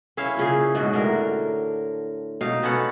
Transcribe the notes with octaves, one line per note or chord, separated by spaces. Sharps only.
C#4 E4 E5 F5
A#2 C#3 G#4
G#2 B2 F#4
A2 D3 A#4
B2 D#4 F5
B3 C#4 A4 F#5